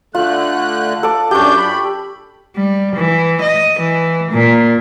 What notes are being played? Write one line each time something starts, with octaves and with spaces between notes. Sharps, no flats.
D3 A3 F4 F#6
A4 D6
F#2 D4 G4 C#6 G6
B5
G3
E3
D#5
E3
A#2